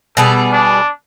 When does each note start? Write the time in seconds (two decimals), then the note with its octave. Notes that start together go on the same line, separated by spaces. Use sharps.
0.17 B2 G3 G#4 A4
0.53 D4